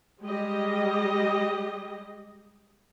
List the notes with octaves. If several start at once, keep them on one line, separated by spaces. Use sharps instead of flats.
G3 G#3 G4 G#4 D#5